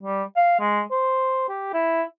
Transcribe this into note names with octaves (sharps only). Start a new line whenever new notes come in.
G3
F5
G#3
C5
G4
E4